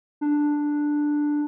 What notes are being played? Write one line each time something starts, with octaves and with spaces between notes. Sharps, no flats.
D4